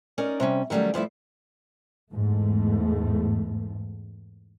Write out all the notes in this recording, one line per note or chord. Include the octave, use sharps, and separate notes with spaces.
C#4 D#4 A#4 D5
C3 G3 C#4
D#3 F#3 G3 A3 C#4
G2 F3 A3 E4
E2 G#2 A3